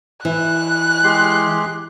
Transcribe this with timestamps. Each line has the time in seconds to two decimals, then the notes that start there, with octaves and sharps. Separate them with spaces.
0.25 E3 F#6
1.04 G#3 G4 C6